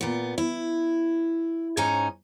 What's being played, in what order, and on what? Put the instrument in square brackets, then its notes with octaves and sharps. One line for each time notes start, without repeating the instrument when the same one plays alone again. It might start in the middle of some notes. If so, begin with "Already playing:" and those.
[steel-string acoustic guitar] A#2 B3
E4
G#2 C#4 D#4 C#5 G#5 A#5